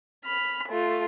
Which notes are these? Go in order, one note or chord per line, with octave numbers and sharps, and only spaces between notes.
B5 F6
A3 F4